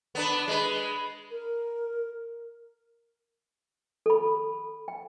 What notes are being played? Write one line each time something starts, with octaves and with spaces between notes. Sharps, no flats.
B3 D4 B4
G#3 B4
A#4
A4 B5
G5